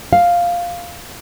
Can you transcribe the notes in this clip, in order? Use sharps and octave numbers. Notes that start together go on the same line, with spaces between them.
F5